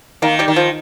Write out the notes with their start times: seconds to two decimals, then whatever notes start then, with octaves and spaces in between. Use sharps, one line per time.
0.22 D#3 A#3
0.39 G3 G4
0.48 D#3
0.56 F3 F4